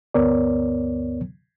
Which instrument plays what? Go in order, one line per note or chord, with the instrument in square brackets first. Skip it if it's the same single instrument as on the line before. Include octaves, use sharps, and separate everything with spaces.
[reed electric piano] D2 G2 B3 A#4 C#5 D5